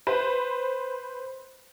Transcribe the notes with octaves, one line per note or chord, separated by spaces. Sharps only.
B4 C5